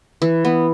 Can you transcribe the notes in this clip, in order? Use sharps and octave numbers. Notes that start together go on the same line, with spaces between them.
E3
B3